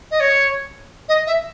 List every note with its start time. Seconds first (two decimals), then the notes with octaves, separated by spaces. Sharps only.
0.11 D#5
0.20 C#5
1.09 D#5
1.27 E5